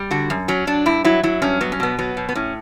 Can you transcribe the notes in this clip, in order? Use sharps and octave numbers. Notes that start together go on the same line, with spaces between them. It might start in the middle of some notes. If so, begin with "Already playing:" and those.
Already playing: G3
D3 F#4
F#2
F#3 C#4
F#3 D4
G2 E4
F#3 E4
F#3 E4
G2 C#4
F#3 B3
C#4
B2 B3
F#3 B3
B2
B3
A2 C#4